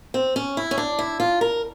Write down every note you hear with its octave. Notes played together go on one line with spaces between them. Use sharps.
C4
C#4
E4
C#4
D4
E4
F4
A#4